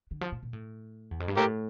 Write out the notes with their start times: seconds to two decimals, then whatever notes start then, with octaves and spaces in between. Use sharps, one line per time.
0.11 D3
0.21 F3
0.32 A#2
0.43 A#2
0.53 A2
1.11 E2
1.20 F2
1.28 G2
1.37 A2 G4 A#4